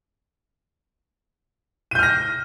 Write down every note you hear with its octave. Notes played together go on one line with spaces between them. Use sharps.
F6 G6 A#6 D#7